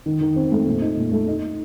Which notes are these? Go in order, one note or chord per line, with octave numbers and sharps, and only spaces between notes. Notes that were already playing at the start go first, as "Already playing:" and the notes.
D#3
D#3
C4
A3
A#2
D#4
A#2
A3
D#4